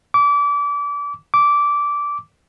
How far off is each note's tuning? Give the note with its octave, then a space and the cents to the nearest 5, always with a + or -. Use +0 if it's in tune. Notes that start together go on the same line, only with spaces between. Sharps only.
D6 -30
D6 -15